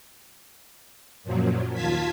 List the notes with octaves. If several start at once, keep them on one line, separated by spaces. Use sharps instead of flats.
F#2 A#2 F3 F#3
D#2 F4 A5 G#6 B6